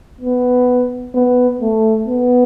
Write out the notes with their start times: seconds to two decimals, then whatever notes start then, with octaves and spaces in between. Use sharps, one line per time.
0.21 B3
1.15 B3
1.61 A3
2.08 B3